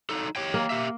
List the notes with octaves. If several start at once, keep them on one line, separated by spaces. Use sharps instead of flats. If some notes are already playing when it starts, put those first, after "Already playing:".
F#3 D#4 A4
G4 C#5 G5
A#3
G4 E5